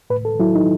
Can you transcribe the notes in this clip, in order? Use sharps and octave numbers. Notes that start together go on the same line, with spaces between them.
A2 B4
A4
F#3 E4
D#4